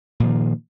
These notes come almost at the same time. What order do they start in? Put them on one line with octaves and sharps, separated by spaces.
A#2 F3 D#3